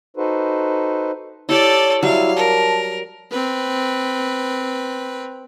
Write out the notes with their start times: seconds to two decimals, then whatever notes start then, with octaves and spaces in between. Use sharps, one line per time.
0.17 D#4 F#4 A4 B4 C5
1.49 E4 G4 A4 C#5 D5
2.03 F#3 G3 E4 F5
2.36 A#4 A5
3.31 C4 B4